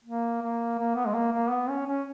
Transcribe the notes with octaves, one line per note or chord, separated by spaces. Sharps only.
A#3
A#3
A#3
B3
G#3
A#3
A#3
B3
C#4
C#4